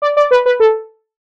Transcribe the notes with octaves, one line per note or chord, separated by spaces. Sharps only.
D5
D5
B4
B4
A4